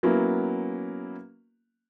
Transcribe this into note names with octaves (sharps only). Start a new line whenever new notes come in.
F#3 A#3 B3 C#4 E4 F#4